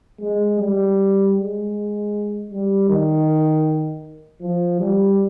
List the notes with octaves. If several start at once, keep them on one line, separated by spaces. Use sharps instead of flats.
G#3
G3
G#3
G3
D#3
F3
G3